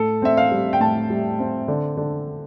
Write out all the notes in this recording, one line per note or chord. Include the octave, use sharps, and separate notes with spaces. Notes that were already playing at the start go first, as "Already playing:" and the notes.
Already playing: A2 A4
C4 E5
F5
G3
G5
A2 A5
G3
C4
D3
D3